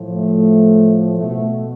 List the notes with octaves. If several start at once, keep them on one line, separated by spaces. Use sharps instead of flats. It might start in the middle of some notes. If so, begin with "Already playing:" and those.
Already playing: A2 F3
A3
B2 A3